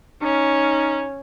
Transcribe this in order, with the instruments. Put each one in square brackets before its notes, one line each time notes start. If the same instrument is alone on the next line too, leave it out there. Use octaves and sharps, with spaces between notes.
[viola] C#4 [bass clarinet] D#4